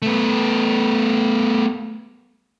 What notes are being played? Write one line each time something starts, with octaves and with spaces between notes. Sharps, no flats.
A3 B3